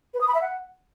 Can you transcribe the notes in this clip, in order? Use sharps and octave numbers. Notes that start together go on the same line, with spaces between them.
B4
D#6
B5
E5
F#5